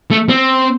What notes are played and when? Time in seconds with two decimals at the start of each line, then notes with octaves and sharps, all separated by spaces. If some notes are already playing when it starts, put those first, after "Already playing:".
0.11 A3
0.29 C4